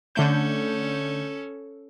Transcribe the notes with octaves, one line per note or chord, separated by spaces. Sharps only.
D3 A3 C#4 A4 G6